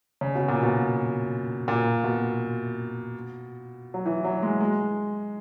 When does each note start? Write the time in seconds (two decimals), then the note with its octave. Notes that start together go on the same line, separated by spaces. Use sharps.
0.21 C#3
0.35 B2
0.48 A#2
0.63 B2
1.68 A#2
2.04 B2
3.94 F#3
4.06 E3
4.24 F#3
4.42 G#3
4.61 G#3